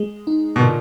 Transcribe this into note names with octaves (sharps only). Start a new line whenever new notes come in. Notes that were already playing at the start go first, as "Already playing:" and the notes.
Already playing: G#3 G#4
D#4
B2
A#2 D3